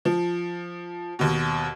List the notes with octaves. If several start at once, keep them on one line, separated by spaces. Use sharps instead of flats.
F3
D#2 B2